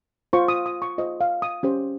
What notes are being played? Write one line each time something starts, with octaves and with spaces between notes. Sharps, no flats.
F4 C5 C#6
D#6
D#6
C#6
F4 C5 D#5
F5
D#6
C#4 G4 C5